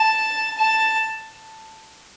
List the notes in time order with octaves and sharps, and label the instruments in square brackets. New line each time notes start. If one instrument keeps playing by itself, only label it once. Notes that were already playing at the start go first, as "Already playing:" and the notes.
Already playing: [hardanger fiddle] A5
A5